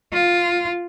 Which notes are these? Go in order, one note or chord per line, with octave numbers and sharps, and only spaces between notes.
F4